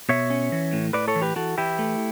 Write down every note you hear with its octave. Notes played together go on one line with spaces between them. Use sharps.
B2 C#5 E5
C#4
E3
A2
A2 B4 D5
A4 C#5
E3
G4 B4
E3 F#4 A4
E3 E4 G4
A3